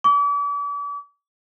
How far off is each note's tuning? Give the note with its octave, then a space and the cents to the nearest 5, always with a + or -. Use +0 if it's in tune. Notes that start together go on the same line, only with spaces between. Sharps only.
D6 -40